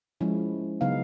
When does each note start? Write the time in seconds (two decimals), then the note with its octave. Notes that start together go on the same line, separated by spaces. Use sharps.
0.21 F3 G#3 C#4 E4
0.81 C#3 F#3 B3 D#4 F5